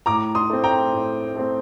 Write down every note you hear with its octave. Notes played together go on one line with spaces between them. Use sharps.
A2 A#5 D6
C6 D#6
A3 C4
G5 A#5
A2
A3 C4